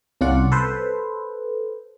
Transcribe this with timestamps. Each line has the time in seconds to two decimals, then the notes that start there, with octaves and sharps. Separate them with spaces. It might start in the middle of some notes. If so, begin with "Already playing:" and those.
0.21 C2 C#4 F4 D5 F#5
0.52 A4 B4 C5